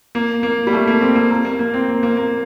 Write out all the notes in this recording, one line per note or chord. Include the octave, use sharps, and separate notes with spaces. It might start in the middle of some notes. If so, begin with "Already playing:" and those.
A#3
A#3
G3
A3
A#3
C4
A#3
A#3
A#3
A#3
C4
A#3
A#3
A#3